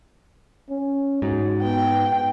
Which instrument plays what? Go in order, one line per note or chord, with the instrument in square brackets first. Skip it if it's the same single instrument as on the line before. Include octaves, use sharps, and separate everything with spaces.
[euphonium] C#4
[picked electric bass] G#2 [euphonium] F#4
[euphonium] B3 [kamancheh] G5